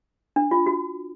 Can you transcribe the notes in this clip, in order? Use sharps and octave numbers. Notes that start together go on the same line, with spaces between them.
D4
F4
F#4